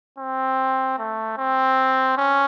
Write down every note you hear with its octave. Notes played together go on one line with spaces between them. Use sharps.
C4
A3
C4
C#4